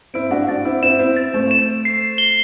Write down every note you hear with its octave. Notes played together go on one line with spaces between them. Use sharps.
C4 E4 D7
D4 F#4
D4 F#4 A6
C4 E4
C4 E4 E7
C4 E4
A6
A3 C4
E7
C7
G7